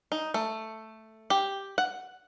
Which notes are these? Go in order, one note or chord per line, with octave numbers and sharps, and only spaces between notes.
D#4
A3
G4
F#5